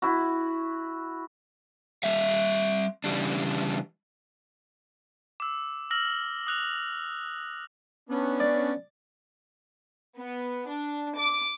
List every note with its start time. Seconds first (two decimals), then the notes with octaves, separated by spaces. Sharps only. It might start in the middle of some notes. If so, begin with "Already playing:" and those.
0.02 E4 F#4
2.03 G3 E5 F5
3.04 C#3 E3 G3 D4
5.40 D6 E6
5.91 E6 F6 A#6 F#7
6.47 D#6 F#6 F7
8.09 B3 C#4 D4
8.40 D5
10.17 B3
10.69 D4
11.18 D6